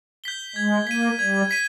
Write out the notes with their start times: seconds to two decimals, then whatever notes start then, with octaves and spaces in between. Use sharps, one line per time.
0.24 G6 B6 G7
0.56 G#3 G#6
0.87 A#3 B6 D#7
1.19 G3 G#6
1.51 B6 D#7